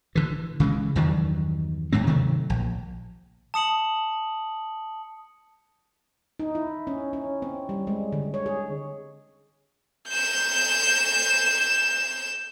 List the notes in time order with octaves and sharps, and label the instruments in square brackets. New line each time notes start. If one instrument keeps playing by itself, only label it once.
[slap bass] D3 E3
C#3 E3 G#3
E2 G2 D#3 F#3
D#2 G#2 F#3 C4
C3 D#3 F#3 A3
A#1
[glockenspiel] A5 D#6 C#7 F#7
[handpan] D#4
E4
C#4
C#4
C4
G3
G#3
D3
C#5
G#4
[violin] G6 E7